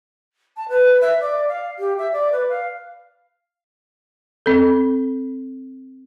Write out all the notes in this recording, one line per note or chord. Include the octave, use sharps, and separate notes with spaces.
A5
B4
E5
D5
F5
G4
E5
D5
B4
F5
C4 A4